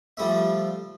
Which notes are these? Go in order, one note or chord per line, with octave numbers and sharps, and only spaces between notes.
F3 G3 A3 E5